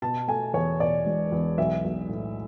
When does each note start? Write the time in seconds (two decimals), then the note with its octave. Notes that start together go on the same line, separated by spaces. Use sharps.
0.02 B2 A5
0.28 A3 G#5
0.54 E2 C#5
0.80 B2 D5
1.06 E1
1.32 E2
1.58 B1 E5
1.84 B1
2.09 A2